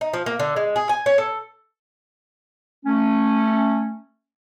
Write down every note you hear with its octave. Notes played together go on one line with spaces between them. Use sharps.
D#4
F3
A#3
D3
G#3
G#4
G#5
C#5
A4
A3 C#4